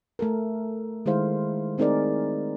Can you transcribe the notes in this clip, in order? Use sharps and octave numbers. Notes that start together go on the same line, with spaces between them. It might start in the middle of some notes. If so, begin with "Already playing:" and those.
A3 A4 A#4
D#3 G#3 E4 C5 F5
A3 C4 D#4 G#4 A#4 D5